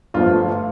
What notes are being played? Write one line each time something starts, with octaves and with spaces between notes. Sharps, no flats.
G1 F3 A3 F4